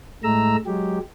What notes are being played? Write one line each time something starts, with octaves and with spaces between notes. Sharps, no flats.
A2 G#3 A3 A#5 E6
F#3 G#3 G4